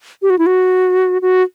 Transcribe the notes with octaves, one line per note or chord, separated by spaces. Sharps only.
G4
F#4
E4
F#4
F#4